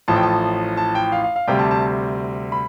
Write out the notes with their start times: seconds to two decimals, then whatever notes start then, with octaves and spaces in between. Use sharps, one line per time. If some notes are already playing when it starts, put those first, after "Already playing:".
0.08 A1 A2 F3 A5
0.16 G5
0.23 A5
0.77 A5
0.95 G5
1.12 F5
1.24 F5
1.36 F5
1.47 D2 C3 G3 G5
1.59 A5
1.71 A5
2.52 B5